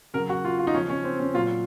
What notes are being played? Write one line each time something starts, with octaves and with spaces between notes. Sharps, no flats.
C#3 F#3 A#4
F#4
F4
F4
D#4
C#3 F3 C#4
C#4
C4
C#4
A#2 F#3 F4